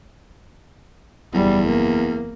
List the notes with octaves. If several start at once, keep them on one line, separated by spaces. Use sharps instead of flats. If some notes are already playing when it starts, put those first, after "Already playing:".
F#1 E2 G3
A#3